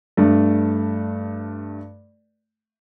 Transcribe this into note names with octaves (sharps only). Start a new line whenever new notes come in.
G2 A3